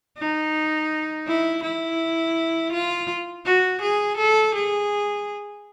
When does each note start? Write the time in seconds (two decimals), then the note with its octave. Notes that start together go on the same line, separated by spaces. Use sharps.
0.18 D#4
1.28 E4
1.63 E4
2.73 F4
3.46 F#4
3.82 G#4
4.18 A4
4.55 G#4